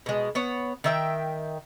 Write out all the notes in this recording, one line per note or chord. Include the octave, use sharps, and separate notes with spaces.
B2 G#3
B3 C#5 F#5
D#3 E5 G5